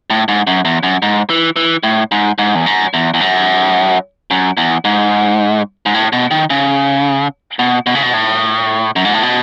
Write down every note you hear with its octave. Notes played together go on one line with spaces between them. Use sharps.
A2
G#2
F#2
E2
F#2
G#2
E3
E3
A2
G#2
G#2
E2
F#2
E2
E2
F#2
F#2
E2
G#2
G#2
A2
B2
D#3
C#3
B2
B2
C#3
B2
A2
F#2
G#2
A2
B2